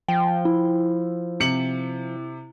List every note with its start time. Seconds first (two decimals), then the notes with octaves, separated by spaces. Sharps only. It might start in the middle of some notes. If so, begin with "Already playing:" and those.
0.08 F3 G5
0.45 E4
1.40 C3 C#7 F#7